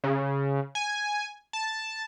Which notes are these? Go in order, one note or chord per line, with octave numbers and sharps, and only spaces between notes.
C#3
G#5
A5